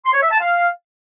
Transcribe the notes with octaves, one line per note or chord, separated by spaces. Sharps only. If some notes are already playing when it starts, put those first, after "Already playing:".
C6
C#5
E5
A5
F5